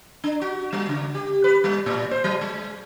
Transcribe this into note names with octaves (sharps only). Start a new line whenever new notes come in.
D4
F#4
G3
C#3
G4
B4
G3
A2
C5
F#3
G#3